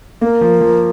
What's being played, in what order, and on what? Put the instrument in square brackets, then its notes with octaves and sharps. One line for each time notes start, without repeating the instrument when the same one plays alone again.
[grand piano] A#3 [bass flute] A#4
[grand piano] F3
F3